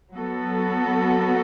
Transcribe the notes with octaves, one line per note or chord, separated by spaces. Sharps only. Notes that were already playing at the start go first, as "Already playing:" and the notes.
F#3 B3 F#4 A4